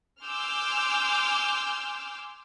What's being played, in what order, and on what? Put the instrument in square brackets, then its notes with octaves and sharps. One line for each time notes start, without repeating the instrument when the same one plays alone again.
[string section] G#5 C6 D6 E6 F6 G6